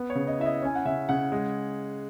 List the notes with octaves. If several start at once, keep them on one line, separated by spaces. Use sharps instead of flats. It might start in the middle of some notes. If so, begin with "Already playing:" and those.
Already playing: B3
C#5
C#3
D#5
E4 E5
D#5
C#4 G#5
F#5
C#3 E5
C#3 F#5
G#3